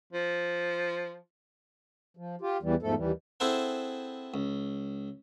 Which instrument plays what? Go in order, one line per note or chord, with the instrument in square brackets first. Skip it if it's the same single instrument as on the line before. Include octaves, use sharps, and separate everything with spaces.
[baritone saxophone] F3
[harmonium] F3
F4 G4
E2 E3 G3
E2 G#2 F3 A3 A4
D#2 E3 G3
[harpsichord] C4 E4 G#4 A4 C5 F#5
C#2